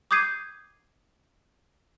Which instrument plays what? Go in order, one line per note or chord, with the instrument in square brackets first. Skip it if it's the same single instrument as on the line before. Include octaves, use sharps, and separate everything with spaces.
[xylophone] D6 D#6 G6 G#6 C7 D#7